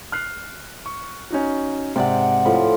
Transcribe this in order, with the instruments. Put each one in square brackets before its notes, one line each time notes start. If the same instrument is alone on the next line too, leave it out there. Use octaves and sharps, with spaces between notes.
[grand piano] F6 F#6 C7
C#6
C#4 D#4 F#4
[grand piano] G#2 [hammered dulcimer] C3 D5 F#5
[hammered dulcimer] A2 F3 B5